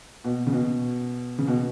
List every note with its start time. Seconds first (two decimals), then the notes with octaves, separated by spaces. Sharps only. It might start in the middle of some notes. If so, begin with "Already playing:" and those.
0.24 B2
0.47 C#3
0.52 B2
1.39 C#3
1.48 B2